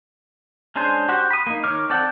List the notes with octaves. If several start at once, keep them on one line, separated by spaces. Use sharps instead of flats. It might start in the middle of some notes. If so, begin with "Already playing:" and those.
G#3 C#4 D4 G#4 C5
F#4 G4 C5 F#5
B5 D#6
A#3 D#4
D#3 C#5 D6 F6
C4 A4 D5 F#5 G5